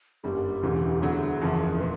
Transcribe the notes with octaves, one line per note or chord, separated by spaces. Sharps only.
G1 F#2 D3 G3 A#3 G4 G#4
E1 D2 C#3 E3
D2 D3 F#3 B3 G#4
F#1 E2 C#3 F3
A#2 B4